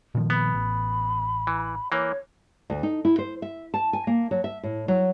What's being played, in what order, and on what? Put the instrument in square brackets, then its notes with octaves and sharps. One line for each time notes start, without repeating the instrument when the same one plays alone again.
[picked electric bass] A#2 D#3 F3
[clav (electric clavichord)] B3 [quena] B5
[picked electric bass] A1
[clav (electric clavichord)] E3
[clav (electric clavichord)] E3 A#3 [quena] C#5
[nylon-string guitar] D2
D#4
E4
C5
E5
A5
G#5
A#3
F#3
E5
A2
F#3